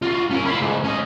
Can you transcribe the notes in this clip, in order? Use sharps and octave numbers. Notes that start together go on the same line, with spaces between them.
F4 F#4
C#4 A#4
E4 F4
C#2 G#2
C#4 D#5